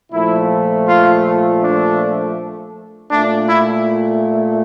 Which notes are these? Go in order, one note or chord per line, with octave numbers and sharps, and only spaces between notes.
A#2 F3 A3 E4
F4
D4
A#2 A3 D4
E4